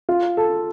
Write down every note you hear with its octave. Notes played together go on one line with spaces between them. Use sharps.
F4
A4